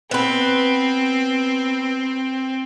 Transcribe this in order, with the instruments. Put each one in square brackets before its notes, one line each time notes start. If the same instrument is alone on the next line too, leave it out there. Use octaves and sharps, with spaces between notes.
[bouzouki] B3 B4 [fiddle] C4